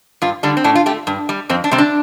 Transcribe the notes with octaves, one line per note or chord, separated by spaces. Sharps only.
G2 F4
D3 G3 D4
C4
A2 D4
F4
A3 G4
G2
G3
F2 C4
D4
C3 G3 C4
D4